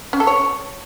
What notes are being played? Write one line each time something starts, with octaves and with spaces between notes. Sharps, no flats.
C#4
A4
C#5